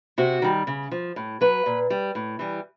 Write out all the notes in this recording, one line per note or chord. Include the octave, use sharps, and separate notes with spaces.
C3 F#4
D#3 G3
C#3
F3
A2
F#3 B4
A#2
G3
A2
E3 G3